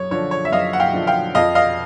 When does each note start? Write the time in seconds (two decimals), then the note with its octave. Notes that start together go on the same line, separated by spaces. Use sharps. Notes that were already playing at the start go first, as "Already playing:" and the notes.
Already playing: F#2 C#5
0.11 D3 F3 C#5
0.31 C#5
0.45 E5
0.52 F#2 D#5 F5
0.73 F#5
0.80 F5 G5
0.94 D3 F3
1.07 F5 G5
1.35 F2 D#5 F5
1.55 D#5 F5